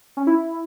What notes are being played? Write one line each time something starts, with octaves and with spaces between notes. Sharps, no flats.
C#4
E4